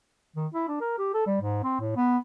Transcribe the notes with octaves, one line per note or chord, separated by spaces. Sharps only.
D#3
E4
D4
A#4
G4
A4
G3
G#2
C4
A2
B3